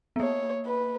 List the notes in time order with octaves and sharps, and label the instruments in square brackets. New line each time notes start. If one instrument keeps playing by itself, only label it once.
[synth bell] B3
[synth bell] A#3 [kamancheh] C#5
[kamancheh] B4